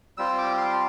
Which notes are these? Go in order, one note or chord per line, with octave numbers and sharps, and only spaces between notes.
G3 C4 F4 E6
D6
C6
A5